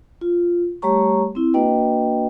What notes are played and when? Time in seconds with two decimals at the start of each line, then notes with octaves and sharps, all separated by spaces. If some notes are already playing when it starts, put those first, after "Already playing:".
0.21 F4
0.82 G3 A3 G4 C#5 A#5 C#6
1.35 C4 E4
1.54 A#3 D4 F#4 B4 D#5 G5